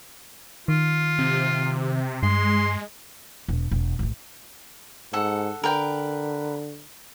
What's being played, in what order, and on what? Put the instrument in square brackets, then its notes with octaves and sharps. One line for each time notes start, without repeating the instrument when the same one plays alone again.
[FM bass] D#3 [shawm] F4
[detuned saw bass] C3
[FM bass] G2 [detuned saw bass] G#3 [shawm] C6
[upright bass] E1
E1
A1 G#2
[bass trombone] G#2 [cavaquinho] A4 F#5
[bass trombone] D3 [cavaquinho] A#4 B4 G5